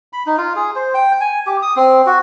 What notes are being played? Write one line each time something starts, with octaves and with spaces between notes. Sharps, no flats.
B5
D#4
F4
G#4
C5
G5
G#5
G4
D#6
C4
F#4